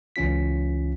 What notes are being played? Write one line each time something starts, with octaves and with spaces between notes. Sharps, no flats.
C#2 E3 C#4 F4 B6